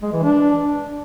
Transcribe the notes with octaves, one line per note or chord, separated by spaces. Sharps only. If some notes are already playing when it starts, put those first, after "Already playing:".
G#3
E3
D4